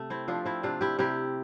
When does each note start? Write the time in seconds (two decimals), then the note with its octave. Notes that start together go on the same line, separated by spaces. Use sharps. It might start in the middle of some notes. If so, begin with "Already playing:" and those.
Already playing: C3 A3
0.10 C4 E4
0.28 F3 D4 F4
0.45 C4 E4
0.63 C3 D4 F4
0.81 E4 G4
0.99 C3 E4 G4